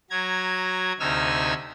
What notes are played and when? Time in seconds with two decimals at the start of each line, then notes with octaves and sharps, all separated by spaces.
0.10 F#3 A#5 G#6
1.00 D2 C3 D#4 G#5 E6 F6